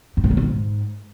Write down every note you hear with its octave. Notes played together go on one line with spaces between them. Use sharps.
G2
A2
B2
A#2
G#2